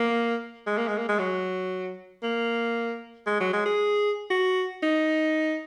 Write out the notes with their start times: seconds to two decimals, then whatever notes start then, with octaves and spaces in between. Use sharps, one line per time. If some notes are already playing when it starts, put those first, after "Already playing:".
Already playing: A#3
0.67 G#3
0.78 A#3
0.88 G#3
0.98 A#3
1.09 G#3
1.19 F#3
2.23 A#3
3.27 G#3
3.40 F#3
3.53 G#3
3.66 G#4
4.30 F#4
4.83 D#4